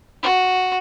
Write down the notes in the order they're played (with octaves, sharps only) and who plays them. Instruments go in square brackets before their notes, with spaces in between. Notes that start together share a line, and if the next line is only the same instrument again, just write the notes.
[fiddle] F#4